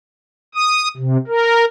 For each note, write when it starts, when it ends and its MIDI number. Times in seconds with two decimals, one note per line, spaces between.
0.55 0.88 87
0.97 1.17 48
1.28 1.65 70